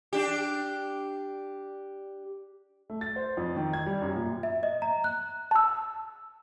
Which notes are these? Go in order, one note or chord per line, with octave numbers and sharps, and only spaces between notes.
D4 G4
A3
A6
C5
F2
D#3
G#6
G3
F#2
A#2
E5
D#5
A#5
F#6
A5 E6